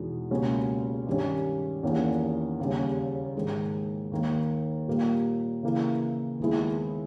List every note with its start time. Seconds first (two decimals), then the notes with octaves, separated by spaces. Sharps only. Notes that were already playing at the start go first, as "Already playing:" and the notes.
Already playing: E2 B2 G#3 D#4
0.31 C#2 B2 A#3 C#4 G4
1.07 G2 D#3 G3 C#4
1.83 E2 D#3 A#3 C#4 G4
2.60 D#2 C#3 G3 C#4
3.36 G#2 D#3 G#3
4.12 D#2 D#3 A#3
4.88 A#2 G3 A#3
5.63 C#3 E3 A#3
6.40 D#2 D#3 G#3 B3 E4